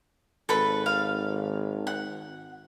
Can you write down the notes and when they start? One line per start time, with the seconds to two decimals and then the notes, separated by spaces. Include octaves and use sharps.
0.49 G#1 A4 B4 B5
0.86 F5
1.87 F#5